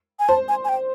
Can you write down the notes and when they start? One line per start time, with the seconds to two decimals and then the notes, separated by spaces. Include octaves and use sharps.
0.19 G#5
0.29 C5 A5
0.48 G#5
0.65 G#5
0.69 G5